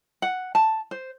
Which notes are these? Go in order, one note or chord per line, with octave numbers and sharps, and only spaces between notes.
F#5
A5
C5